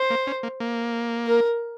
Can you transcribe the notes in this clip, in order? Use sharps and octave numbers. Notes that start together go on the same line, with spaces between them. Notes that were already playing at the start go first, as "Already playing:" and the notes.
Already playing: C5
A#3
C#4
A#3
A#3
A#4